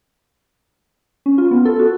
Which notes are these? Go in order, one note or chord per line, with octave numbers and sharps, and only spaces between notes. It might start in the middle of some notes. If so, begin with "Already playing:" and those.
C#4
F4
B3
A4
F#4